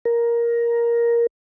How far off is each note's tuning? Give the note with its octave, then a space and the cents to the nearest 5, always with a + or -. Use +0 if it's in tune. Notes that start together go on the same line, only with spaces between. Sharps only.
A#4 +10